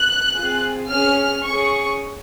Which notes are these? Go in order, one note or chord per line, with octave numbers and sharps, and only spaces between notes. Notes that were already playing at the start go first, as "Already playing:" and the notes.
Already playing: F#6
C4 F4 G#4
C#4 G#4 F6
C#4 G#4 C#6